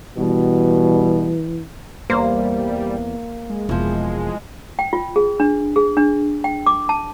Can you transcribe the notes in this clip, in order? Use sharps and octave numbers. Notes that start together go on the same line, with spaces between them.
B2 E3 G3
E2 G3 A#3 C5
G#3
E1 E3 F3
G5
F4
G#4
D4
G#4
D4
G5
D6
A5